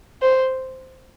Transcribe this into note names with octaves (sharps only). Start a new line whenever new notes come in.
C5